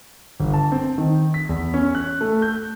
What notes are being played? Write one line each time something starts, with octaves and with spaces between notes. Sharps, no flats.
G1
A5
C4
D#3
B6
E2
C#4
F#6
A3
G6